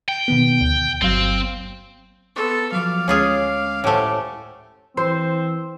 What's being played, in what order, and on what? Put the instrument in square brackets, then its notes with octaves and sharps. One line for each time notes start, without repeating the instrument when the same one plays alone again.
[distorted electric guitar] G5
[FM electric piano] B2 D#3 B3
D2
[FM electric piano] G1 F#3 F5 [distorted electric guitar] C4
[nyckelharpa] B3 A4 [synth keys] C6 C#6
[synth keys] F3 F#3 [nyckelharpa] F5 D6
[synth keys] D2 G#3 C7 [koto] C#4 F4 G#4
[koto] A2 A3 [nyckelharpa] G4 [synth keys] C5 F#5 G#5
[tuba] E3 [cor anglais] C4 [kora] C5